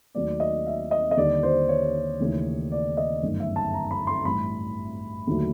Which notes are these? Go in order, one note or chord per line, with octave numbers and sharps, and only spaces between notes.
D#2 D#3 F#3 A3 D5
D#5
E5
D#5
D#5
D#2 D3 G3 D5
C5
C#5
D#2 C#3 E3 A3
D5
D#5
G1 F#2 D#3 F#3 A3
E5
A5
A#5
B5
C6
A1 G2 E3 B5
D#2 D3 F#3 A3